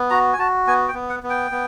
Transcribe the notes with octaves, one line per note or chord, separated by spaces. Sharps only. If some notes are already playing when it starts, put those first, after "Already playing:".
Already playing: B3
F#4 A#5
G#5
F#4 A5
B3 G#5
G5
B3
F#5
B3
G5
B3